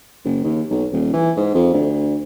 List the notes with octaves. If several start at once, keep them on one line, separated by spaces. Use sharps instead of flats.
F#1
D#2
B1
D#1
E3
G#2
F2
D2